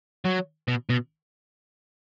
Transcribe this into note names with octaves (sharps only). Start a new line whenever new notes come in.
F#3
B2
B2